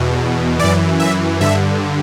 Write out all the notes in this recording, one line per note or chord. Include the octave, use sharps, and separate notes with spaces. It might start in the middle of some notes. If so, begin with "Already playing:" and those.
Already playing: E2 B2
F#2 E3 D5
E5
G2 D3 E5